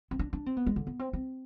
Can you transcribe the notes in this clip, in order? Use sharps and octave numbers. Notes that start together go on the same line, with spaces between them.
C4
D4
D4
C4
B3
G#3
D3
B3
C4
C4